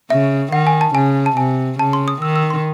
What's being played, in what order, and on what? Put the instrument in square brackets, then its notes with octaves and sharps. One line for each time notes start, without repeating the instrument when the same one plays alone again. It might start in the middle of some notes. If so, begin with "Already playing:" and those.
[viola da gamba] C#3 [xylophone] E5
[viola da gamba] D#3 [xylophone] F#5
[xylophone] G#5
A5
[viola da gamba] C#3 [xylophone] G#5
[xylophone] A5
[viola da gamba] C3 [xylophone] G#5
[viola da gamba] C#3 [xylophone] A5
[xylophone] C6
D#6
[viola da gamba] D#3 [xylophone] E6
[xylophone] E6
C6